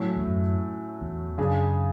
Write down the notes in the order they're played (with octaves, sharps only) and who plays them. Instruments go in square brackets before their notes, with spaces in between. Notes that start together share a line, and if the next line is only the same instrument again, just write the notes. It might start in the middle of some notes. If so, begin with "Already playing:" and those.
Already playing: [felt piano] A2 F#3 A3 C#4
[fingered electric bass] E2
F#2
E2
[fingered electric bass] F#2 [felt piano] C#3 G#3 D4 G#4